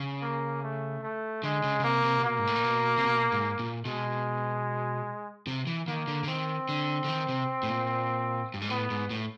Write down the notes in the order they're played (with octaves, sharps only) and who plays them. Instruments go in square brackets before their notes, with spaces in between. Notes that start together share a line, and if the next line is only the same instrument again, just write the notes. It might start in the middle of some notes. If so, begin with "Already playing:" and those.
Already playing: [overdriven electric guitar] C#3
[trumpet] A#3
A3
A3
[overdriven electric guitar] D3 [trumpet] G#3
[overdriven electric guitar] C#3
C#3
[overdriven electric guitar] C3 [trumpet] A#3
[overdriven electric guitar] C3
C3
[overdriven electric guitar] B2 [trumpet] A#3
[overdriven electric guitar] G#2
A2
A#2
B2
C3
B2
G#2
A#2
[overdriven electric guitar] B2 [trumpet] G#3
[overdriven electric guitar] C3
E3
[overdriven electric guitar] D#3 [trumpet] A#3
[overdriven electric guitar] D3
D3
[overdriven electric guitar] D#3 [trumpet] C4
[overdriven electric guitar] D3
D3
D#3
C3
A2
A#2
G2
G#2
[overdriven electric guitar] A2 [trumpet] B3
[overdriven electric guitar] G#2
A2